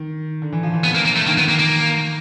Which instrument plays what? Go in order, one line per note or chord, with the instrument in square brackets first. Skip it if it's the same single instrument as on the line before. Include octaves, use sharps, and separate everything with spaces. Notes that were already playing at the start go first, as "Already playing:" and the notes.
Already playing: [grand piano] D#3
D3
E3
F3
E3
[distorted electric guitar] B3
A#3
A#3
A3
[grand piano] D#3 [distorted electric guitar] A#3
[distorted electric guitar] B3
A#3
A#3